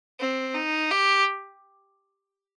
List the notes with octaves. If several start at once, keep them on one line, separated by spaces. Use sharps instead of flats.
C4
D#4
G4